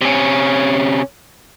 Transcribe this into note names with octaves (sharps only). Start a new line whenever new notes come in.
C3 C#4